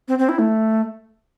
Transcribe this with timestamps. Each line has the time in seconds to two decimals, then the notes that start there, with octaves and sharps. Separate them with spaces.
0.08 C4
0.19 C4
0.29 E4
0.39 A3